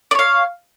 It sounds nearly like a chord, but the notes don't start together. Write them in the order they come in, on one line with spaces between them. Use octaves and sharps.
D5 C#5 F5